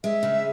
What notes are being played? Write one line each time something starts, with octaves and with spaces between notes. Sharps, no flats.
G#3 E5
C#3